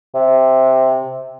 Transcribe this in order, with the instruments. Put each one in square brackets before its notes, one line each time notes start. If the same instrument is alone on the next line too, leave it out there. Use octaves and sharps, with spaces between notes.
[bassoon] C3